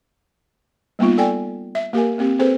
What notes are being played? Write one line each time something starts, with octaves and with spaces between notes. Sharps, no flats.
G3 A#3 B3 D#4 F4
A4 D5 G5 G#5
E5
A#3 G4 A#4 G#5
A#3 C4 G4
C4 G#4 A4 B4 C5